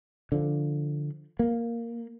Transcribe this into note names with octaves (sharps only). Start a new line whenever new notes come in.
D3 F3
A#3